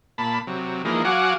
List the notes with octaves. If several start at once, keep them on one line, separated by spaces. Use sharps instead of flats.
A#2 A5 B5
C3 F#3
E3 F3 G#3 A#3 D#4
F#3 F#4 F5 F#5 G#5 D6